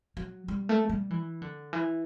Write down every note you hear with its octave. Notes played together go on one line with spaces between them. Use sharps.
F#3
G3
A3
G3
E3
D3
E3